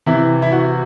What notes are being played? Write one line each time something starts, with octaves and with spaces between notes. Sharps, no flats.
C3 E3 E4
E4
F#4